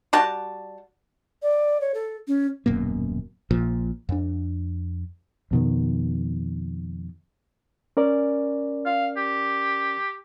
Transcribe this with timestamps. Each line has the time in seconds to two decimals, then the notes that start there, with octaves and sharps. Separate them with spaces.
0.13 G3 F#4 A5
1.42 D5
1.81 C#5
1.94 A4
2.27 C#4
2.66 D#1 F#2 B2 A#3
3.51 A#1 A#2 F3
4.09 F2 D4
5.51 F2 B2 D#3
7.97 C#4 A#4 D5
8.86 F5
9.17 G4